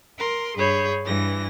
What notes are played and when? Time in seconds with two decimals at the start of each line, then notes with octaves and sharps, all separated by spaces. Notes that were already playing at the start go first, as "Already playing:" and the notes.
0.18 A#4 C6
0.56 G2 G#4 C#5 B5 G6
1.05 G2 E3 A#6